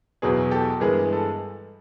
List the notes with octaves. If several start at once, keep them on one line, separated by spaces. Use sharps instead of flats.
E2 B2 F#3 B3 G#4
G4 A4
G2 E3 G#3 B3 G#4 A#4
A4